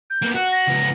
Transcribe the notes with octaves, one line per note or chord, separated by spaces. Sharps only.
G6
A#3 B3
F#4 F#6
A#6
C#2 B3